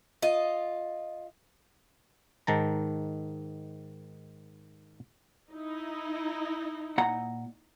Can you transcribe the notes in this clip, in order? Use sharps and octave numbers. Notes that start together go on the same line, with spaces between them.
F4 D#5
G#2 D#3 A5 A#5
D#4 E4
A#2 F#5 A#5